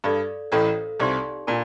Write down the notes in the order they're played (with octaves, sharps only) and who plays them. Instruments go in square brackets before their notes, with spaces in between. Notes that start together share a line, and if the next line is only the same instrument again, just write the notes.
[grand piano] G2 [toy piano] A4 D5 F5
[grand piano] A1 A2 [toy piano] A4 C5 F5
[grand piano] C2 C3 [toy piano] D#4 G4 D5 F5 C6
[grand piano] A#2 [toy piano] D4 F4 A#4 D5 A5